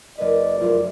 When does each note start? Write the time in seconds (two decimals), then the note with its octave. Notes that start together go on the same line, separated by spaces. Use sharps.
0.18 F#1 B4 D5 D#5
0.60 F1 F#2 F4